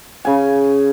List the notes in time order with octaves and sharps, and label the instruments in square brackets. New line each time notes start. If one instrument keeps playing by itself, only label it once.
[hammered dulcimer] C#3 G#5